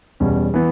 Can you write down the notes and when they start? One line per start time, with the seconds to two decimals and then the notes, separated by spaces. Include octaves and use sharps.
0.20 E2 B2 G3 C#4
0.54 E3 B3